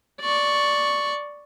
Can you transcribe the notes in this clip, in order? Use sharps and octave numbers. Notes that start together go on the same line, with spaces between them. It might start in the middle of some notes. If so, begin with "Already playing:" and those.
D5 C#6